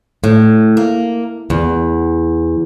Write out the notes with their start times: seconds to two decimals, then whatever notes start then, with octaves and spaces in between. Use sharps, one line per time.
0.24 A2
0.77 A#3
1.50 E2